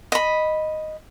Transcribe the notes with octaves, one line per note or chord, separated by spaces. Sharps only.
D#5 B5